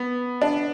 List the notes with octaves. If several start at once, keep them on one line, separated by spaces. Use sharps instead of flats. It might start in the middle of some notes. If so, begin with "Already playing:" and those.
Already playing: B3
D4